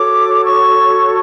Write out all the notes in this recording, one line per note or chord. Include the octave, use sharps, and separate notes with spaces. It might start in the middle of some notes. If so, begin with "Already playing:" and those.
Already playing: F#4 A4 C#5 D6
C#6